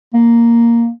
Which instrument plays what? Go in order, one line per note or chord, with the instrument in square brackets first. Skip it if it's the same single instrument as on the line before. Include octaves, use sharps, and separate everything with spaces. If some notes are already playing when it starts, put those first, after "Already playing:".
[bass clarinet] A#3